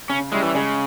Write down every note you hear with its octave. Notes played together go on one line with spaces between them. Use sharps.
C#3 C#4
G3 G#3 C#4 E4
E3
C#3 G#3